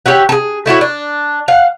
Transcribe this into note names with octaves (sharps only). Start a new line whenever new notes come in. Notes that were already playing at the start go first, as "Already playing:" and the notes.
G4 C#5 E5 F#5
G#4 A4
A3 E4 F#4 C#5
D4
F5 F#5